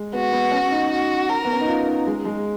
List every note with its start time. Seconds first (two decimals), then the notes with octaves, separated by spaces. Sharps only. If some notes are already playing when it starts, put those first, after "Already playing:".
Already playing: G#3
0.13 B3 F#4
0.32 B3
0.52 C#4
0.71 D#4
0.91 F#4
1.29 A#4
1.45 B3
1.52 C#4
1.61 D#4
1.68 F4
1.88 D#4
2.07 G#3
2.25 G#3